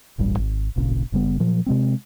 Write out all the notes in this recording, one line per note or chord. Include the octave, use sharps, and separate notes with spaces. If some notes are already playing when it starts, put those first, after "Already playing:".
D1 A1 G2 G3
G#1
D1 G#1 A#2 C#3
F#1 C#3 G3 B3
A#2 F3 F#3
C3 G#3 C4